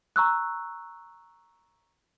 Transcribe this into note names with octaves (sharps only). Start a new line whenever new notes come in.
A#5 C#6 E6 F#6